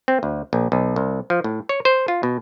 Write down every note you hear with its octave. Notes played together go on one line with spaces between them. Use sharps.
C4
D2
A#1
B1
C2
F3
A2
C#5
C5
F4
B2